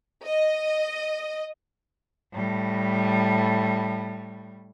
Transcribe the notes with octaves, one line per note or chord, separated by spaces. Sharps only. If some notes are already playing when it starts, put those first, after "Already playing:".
D#5
A2 G3